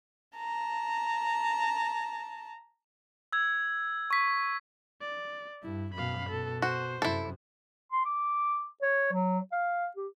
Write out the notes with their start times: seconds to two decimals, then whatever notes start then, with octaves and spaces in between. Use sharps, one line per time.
0.37 A5 A#5
3.33 E6 G#6
4.11 C#6 B6
5.01 D5
5.63 G2 E4
5.94 F#2 B2 F5 B5
6.29 B2 A4
6.62 F#4 C5
7.02 F#2 C3 E4 A4
7.92 C6
8.05 D6
8.82 C#5
9.12 F#3
9.52 F5
9.96 G4